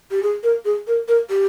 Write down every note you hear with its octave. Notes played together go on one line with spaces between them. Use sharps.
G4
G#4
A#4
G#4
A#4
A#4
G4